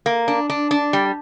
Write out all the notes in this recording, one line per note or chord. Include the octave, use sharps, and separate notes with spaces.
A#3
D4
D4
D4
G3